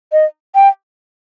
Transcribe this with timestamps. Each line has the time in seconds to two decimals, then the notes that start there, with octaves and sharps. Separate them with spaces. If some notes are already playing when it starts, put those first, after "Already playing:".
0.12 D#5
0.55 G5